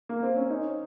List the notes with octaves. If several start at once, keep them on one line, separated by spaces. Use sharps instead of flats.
A#3
C4
C#4
D#4